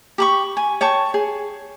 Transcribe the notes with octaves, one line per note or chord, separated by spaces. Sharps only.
G4 B5 C#6
G#5
C#5 G5 A5 C#6
G#4